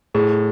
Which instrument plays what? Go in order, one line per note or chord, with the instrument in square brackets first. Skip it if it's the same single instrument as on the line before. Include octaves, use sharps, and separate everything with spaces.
[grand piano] A2 [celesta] G#4